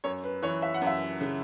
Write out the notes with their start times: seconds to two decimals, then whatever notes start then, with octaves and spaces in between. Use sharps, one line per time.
0.04 F#2 C#5
0.24 B4
0.43 E3 C#5
0.62 E5
0.74 F#5
0.82 F#2
0.87 E5
1.21 C#3